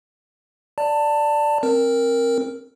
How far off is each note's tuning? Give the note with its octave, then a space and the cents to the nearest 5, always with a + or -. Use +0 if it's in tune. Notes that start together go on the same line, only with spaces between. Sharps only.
D5 +0 A5 +20
C4 +25 A#4 +0